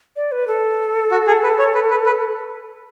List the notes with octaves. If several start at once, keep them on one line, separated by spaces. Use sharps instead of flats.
D5
B4
A4
F#4
G#4
B4
C#5
B4
B4
B4